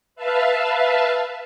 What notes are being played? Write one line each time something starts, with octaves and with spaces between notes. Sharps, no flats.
B4 E5 F5 A5